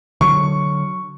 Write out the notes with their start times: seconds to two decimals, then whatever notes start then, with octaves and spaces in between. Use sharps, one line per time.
0.21 D3 F#3 C#6